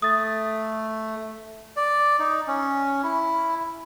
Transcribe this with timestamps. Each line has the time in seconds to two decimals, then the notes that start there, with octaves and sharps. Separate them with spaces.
0.02 A3 D#6 A6
1.76 D5
2.19 D#4
2.48 C#4
3.03 E4